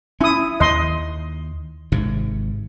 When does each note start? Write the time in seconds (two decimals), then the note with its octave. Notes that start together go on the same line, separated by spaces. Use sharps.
0.21 C#4 E4 D#6
0.60 D#2 D#5 C6
1.92 G#1 G#2 C3